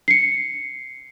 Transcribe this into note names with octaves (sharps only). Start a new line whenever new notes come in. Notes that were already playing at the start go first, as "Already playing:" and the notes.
C7 C#7